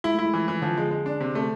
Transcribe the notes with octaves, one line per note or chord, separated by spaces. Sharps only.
G#3 E4
A3 E4
G#3
E3
E3
D3 F3
G#3
G#3
D4
C3
A3